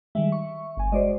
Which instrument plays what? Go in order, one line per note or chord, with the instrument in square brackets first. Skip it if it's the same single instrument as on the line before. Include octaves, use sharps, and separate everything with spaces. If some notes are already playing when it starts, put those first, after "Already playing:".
[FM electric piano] D#3 G3 G#3 [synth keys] E5
[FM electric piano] C#6
[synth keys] G1 G#5
[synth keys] G#3 F#4 [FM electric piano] C5 D5 D#5